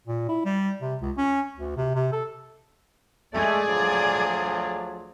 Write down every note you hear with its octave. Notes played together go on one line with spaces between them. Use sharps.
A#2
E4
G3
C3
C#2
C#4
D2
C3
C3
A4
G#3 A3 G#4 D5
D2 F3 F#3